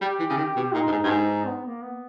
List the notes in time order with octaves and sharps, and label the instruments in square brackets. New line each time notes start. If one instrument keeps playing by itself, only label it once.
[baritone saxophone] G3 [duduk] G4
[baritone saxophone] E3
C#3
D#3
B2
[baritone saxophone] A#2 [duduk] D#4
[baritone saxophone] G2
G#2
G2
G#2
[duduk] B3
A#3
B3